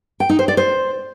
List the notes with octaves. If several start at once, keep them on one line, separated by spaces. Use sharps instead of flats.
G5
D#4
C5
D5
C5